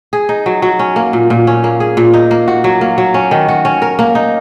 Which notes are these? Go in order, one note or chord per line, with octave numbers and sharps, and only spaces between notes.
G#4
D#4
F#3
F#3
C#4
A#3
A#2
A#2
C#4
A#3
G#4
A#2
D#4
A#3
F#4
F#3
A#3
F#3
C#4
D#3
F#4
C#4
A#4
A#3
D#4